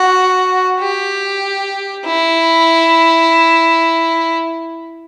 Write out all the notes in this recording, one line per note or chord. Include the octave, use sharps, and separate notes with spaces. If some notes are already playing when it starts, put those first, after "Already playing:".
Already playing: F#4
G4
E4